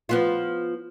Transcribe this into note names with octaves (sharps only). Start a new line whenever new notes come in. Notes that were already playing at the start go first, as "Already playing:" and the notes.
F3 B3 F4